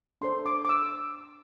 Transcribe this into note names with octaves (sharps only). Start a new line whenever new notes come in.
D4 A4 C5 C6
D6
D6
E6